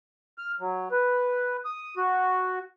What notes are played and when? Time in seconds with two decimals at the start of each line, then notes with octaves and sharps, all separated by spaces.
0.38 F6
0.60 F#3
0.92 B4
1.65 D#6
1.97 F#4